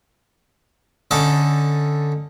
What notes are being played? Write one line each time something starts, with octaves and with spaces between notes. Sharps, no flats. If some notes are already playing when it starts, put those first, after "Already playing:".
D3 C#4 D#4 A4 A5 D6